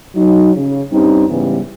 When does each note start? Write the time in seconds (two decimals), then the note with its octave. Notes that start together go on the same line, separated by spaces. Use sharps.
0.15 F#3 D#4
0.55 C#3
0.91 G2 G3 C4 C#4 D#4
1.29 G#2 C#3 E3 G3 B3